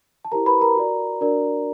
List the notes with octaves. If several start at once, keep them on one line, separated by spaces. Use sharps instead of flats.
A5
E4 G4 A#4 C5 A#5
B4 B5
A#4 A#5
F#4 A#4 D5
D4 F#4 A#4 D5